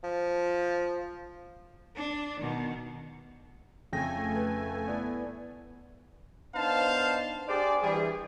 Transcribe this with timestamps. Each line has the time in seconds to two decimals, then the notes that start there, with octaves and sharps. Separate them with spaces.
0.04 F3
1.96 D4
2.41 B2 D#3
3.93 F2 C#3 A3 G5 G#5 A#6
4.35 B4
4.87 B3 E4 B4 D5
6.55 B3 D4 D#4 C5 F5 A5
7.48 D4 G4 G#4 C5 D5
7.83 E3 G3 G#4